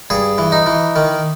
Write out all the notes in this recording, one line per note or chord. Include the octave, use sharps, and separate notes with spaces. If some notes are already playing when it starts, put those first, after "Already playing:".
G2 G#4
E3
D#4
E3
D#3